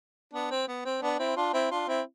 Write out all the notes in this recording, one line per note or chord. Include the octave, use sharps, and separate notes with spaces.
B3 D4
C4
B3
C4
B3 D4
C4 E4
D4 F4
C4 E4
D4 F4
C4 E4